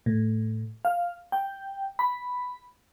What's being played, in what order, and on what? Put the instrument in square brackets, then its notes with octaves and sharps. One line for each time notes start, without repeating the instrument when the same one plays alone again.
[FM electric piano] A2
F5
G5
B5